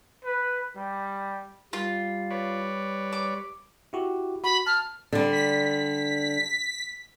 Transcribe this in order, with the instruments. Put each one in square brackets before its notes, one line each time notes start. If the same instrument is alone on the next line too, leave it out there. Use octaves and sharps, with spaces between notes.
[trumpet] B4
G3
[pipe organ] G3 [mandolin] F4
[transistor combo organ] B4 C#5 D5
[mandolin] D6
[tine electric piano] E4 F#4 G4
[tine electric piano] F#4 [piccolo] B5
[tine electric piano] A5 [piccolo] F6
[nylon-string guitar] D3 G3
[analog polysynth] B6